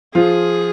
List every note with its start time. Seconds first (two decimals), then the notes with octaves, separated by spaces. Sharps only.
0.15 F3 F4 G#4